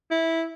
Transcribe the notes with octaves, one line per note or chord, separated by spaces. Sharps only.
E4